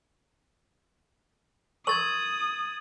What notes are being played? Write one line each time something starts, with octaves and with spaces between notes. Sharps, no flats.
A#4 C6 C#6 D#6 G#6 A6 F#7